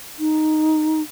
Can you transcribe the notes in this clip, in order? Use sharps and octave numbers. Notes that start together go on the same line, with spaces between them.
D#4